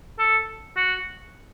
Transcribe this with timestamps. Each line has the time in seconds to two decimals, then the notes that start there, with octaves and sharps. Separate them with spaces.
0.19 A4
0.77 F#4